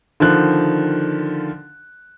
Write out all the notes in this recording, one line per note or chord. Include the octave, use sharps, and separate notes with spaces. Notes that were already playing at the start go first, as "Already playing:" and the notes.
D3 D#3 F3 F#6